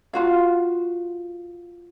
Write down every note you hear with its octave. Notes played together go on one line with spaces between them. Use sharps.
F4 F#4 F5